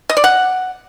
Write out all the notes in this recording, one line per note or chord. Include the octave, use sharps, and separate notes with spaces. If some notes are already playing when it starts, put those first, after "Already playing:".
D#5
D5
F#5